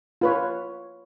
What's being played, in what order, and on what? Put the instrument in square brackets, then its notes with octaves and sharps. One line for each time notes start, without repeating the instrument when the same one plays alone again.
[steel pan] F4 B4 C#5